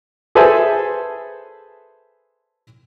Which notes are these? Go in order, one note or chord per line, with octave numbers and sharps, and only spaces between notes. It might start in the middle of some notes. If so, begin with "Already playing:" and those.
G#4 A4 B4 C5 E5 G#5